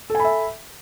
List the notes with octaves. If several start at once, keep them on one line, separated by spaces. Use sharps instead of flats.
A4 E5 G#5 B5